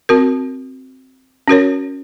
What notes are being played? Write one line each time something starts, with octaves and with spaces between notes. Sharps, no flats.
C4 F#4 A#4
C#4 F#4 A#4 C#5